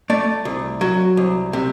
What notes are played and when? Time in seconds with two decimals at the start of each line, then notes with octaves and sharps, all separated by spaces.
0.10 A3 D5
0.45 C2
0.81 F#3
1.17 C2
1.53 C3